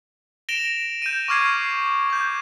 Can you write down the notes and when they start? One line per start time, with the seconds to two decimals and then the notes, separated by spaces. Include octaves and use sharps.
0.49 A#6 D7 E7 F7 G7
1.02 G6 D#7
1.28 C#6 D6 F6 G#6 C7
2.10 D6 G6